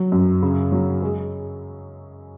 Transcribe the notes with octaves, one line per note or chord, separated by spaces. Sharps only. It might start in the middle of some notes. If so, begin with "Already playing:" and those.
Already playing: F#3
F#2
C#3
F#3
G#3